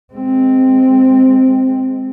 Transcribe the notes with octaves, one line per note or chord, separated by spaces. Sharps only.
G#3 C4